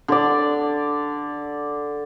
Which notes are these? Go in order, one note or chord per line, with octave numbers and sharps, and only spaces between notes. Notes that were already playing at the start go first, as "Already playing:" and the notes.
D3 D5